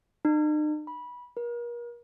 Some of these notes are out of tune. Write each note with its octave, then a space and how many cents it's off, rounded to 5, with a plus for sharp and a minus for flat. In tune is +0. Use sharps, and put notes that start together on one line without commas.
D#4 -45
B5 -15
A#4 +40